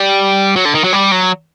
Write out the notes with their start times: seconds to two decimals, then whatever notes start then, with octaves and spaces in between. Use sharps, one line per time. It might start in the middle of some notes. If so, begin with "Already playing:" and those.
Already playing: G3
0.56 F#3
0.65 D3
0.75 D#3
0.84 F#3
0.93 G3
1.12 F#3